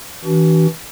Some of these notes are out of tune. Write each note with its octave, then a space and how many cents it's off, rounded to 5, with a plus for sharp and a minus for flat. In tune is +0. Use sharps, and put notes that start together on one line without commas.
E3 -30 D4 -35 F#4 +40